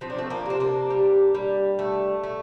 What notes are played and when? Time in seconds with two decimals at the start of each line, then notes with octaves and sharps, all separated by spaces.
0.01 F3 C4
0.10 D4
0.18 A3 C4
0.30 A#3 D4
0.46 C3 C4
0.60 A#3 D4
0.90 G3
1.35 G3
1.79 A3
2.23 A3